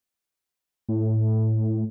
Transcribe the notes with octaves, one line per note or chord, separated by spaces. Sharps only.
A2